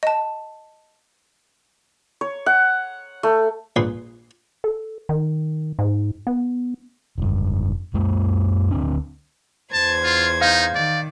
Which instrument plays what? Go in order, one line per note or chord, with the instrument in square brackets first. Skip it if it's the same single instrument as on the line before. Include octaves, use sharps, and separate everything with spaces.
[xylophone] D#5 A5
[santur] C#5
F#5
A3
[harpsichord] A#1 A#2 G#4 B4 C6
[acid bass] A4
D#3
G#2
B3
[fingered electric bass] F1 G2
F#2 G#3 A#3
D2 C4 D4
[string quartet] E2 C5 G#6 [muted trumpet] A5
[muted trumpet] F4
[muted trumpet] D#4 [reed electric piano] F5 G6
[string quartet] D#3 [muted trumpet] D5